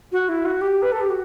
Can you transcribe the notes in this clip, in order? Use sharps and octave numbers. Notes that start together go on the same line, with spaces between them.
F#4
E4
F#4
G4
B4
A4
G4
F#4